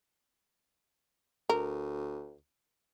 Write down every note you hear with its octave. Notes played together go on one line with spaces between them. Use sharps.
D2 A#4